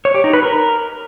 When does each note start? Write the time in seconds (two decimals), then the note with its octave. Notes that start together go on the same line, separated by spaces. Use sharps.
0.05 C#5
0.15 G4
0.24 D#4
0.33 B4
0.43 A#4